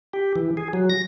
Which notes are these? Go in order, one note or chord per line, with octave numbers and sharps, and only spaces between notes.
G4
E3
G#4
F#3
A#6